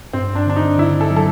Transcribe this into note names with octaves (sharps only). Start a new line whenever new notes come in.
G2 C4
D4
D3 D4
D#4
D3 E4
A4
F#3
A4